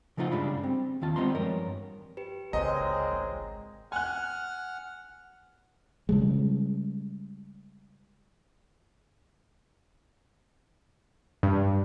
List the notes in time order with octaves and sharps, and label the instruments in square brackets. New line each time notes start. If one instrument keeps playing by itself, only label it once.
[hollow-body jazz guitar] C#3 F3 A3 D#4 F4 F#5
G2 C#3 G3 G#3 D4 B5
C4
D#2 D#3 F4 A5
G3 G#3 B3 C4 A#5 C6
G2 F3 A#4 C#5
[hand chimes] G4 B4
[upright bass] G1 C#2 [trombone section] A#2 G#3 C4 [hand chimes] C#5 A#5 [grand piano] D#5
[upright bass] G#1
[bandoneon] F#5 F6 [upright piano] G#5 F#6
[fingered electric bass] C#3 G3 G#3
[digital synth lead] G2